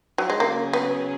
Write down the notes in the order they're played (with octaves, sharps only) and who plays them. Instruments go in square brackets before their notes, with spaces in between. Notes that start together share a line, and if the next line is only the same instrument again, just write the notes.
[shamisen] F#3
G#3
[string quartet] C#3 F#3 C#4 G#4 [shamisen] A#3
[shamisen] B3